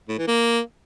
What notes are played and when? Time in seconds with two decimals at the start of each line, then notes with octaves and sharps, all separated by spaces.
0.09 A2
0.18 E3
0.28 A#3